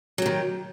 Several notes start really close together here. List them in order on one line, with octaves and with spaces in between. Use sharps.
F#3 G4 D#3